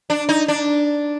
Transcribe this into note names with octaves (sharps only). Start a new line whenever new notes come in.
D4
D#4
D4